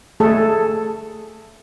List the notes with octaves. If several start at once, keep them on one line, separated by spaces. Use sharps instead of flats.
A3 G#4 A4